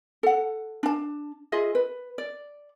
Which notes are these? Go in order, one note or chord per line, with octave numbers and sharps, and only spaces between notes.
A4 F#5
D4 A5
F4 G#4 D#5 E5
B4
D5